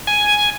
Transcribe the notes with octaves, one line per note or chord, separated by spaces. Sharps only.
G#5